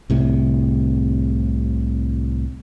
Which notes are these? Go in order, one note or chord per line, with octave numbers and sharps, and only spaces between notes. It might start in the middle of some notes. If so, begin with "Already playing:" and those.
C2 A2 C3